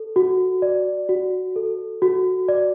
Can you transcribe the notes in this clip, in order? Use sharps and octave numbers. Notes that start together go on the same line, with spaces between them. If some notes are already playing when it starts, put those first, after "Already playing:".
Already playing: A4
F#4
D5
F#4
A4
F#4
D5